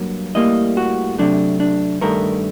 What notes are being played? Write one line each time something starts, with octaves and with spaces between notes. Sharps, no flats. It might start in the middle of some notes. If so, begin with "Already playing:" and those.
Already playing: G2 F#3 A#3
A2 G3 A#3 D#5
F#4
C3 F#3 A3 D4
D4
G2 D#3 A3 A#4